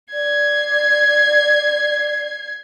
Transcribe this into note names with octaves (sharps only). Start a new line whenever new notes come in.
D5 G#6 C7